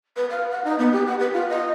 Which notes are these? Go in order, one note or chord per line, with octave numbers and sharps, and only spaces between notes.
B4
F5
F#5
D#4
B3
G4
F#5
B4
F4
D#5